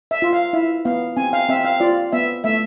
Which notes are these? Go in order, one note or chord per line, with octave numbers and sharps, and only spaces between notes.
E5
F4
F5
E4 E5
B3 F5
C4 G#5
F5
C4 E5
F5
F4 D5
B3 E5
A3 E5